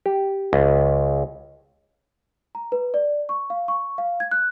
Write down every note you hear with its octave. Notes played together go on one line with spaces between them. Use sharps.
G4
C#2
A#5
B4
D5
C#6
F5
C#6
F5
G#6
F#6